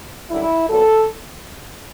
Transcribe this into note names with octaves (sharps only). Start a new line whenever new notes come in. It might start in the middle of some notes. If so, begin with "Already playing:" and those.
F#2 D3 G3 E4
A#2 F#3 B3 A4